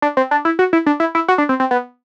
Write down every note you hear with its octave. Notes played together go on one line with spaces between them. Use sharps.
D4
C4
D4
E4
F#4
E4
D4
E4
E4
F#4
D4
C4
C4
B3